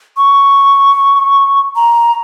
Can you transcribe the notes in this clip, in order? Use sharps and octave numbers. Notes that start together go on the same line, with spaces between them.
C#6
A#5